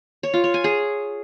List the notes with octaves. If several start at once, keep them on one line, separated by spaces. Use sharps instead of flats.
C#5
F4
C#5
G#5
G#4